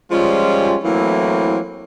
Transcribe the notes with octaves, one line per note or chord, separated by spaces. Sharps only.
F3 G3 G#3 C#4 F4
E3 F#3 A3 A#3 C4 E4